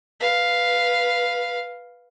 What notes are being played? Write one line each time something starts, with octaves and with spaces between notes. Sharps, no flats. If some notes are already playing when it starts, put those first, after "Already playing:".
B4 F5